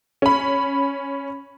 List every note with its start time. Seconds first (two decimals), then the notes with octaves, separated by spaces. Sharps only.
0.22 C#4 B5